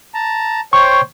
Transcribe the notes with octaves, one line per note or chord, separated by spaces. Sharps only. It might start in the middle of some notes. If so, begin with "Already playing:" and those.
A5 A#5
C5 C#5 G5 C#6